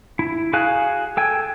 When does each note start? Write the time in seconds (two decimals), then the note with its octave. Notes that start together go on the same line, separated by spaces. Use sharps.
0.19 E4
0.53 F#4 G#4 F5 G#5 F#6
1.17 A4 G5 G#5